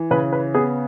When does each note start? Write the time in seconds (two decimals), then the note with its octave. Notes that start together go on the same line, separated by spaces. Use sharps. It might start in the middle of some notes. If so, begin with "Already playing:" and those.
Already playing: E3
0.11 C#3 B4
0.33 B4
0.54 B3 G#4